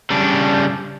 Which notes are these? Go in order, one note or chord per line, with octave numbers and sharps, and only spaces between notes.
C#3 G3 D4